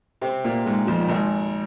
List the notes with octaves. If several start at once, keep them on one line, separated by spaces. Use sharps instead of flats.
C3 C4
A#2 A#3
G#2 G#3
F2 F3
A#2
G#1 G#2